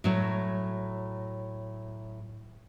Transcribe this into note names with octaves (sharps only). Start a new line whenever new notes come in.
A2 F#3 C#5